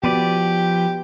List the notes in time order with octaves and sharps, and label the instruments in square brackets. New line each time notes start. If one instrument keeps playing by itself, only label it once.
[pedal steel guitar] F3 B4 D5 [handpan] B3 F#4 [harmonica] G4